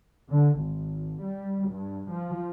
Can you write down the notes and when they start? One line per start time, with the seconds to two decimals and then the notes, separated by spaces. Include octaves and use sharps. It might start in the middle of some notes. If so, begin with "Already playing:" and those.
0.29 D3
0.60 G#1
1.22 G3
1.69 G2
2.10 F3